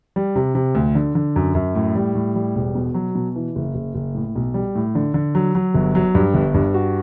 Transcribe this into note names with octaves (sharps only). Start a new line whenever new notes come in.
G3
C3
C3
D2
D3
D3
F#2
F#2
A2
G3
A2
G3
E1
B2
F#3
B2
E3
F#1
F#1
F#1
A2
B1
G3
A2
D3
D3
F#3
F#3
G1
F#3
G2
G1
G2
F#4